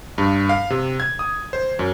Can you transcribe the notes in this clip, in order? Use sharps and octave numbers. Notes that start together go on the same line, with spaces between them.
G2
F5
C3
G#6
D#6
C5
F#2